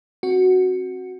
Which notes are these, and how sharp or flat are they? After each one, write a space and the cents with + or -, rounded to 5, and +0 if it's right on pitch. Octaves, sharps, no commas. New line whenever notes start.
C4 +25 F#4 +0